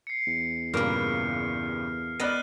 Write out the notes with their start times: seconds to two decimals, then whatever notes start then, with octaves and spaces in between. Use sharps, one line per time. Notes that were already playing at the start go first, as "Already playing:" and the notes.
0.07 C7 C#7
0.27 E2
0.74 G2 A#2 C#3 A#3 B4 F6
2.20 B3 D5 D#5 B5 F6 F#6 A#6 D#7